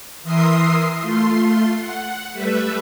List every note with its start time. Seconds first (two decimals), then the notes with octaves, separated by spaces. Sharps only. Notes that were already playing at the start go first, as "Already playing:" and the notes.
0.23 E3 A#4 E5 C6 D#6 C7
1.01 A3 F4 C6
1.78 F#5
2.33 G3 A3 B4 E5